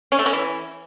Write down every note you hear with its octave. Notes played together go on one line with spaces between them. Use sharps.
C#4
A3
C#4
E3